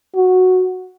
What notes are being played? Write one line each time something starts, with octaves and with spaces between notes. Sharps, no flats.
F#4